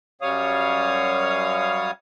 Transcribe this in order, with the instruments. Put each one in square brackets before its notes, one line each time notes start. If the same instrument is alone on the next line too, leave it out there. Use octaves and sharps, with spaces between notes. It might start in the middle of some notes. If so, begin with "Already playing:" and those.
[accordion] F#2 G3 C#5 F5 D#6